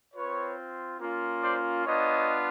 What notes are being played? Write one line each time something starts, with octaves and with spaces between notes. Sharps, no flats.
C4 F4 B4 C#5
A#3 C#4 F4
C5 D5
B3 D4 F4 C#5 D#5